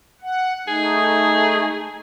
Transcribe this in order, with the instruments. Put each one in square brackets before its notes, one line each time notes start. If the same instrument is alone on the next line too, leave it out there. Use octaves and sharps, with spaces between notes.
[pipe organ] F#5
[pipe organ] A3 D#4 [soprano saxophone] G#4